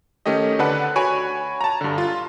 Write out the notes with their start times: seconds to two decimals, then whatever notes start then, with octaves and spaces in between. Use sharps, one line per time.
0.26 D#3 A3 C#4 G4 D#5
0.59 D3 D4 A4 B4 F#5 F#6
0.96 F#4 C#5 G#5 B5 C#6 D7
1.61 A5 A#5
1.81 G2 D3
1.98 F4